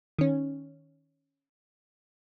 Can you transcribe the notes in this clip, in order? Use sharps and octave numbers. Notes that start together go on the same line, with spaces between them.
D#3 C#4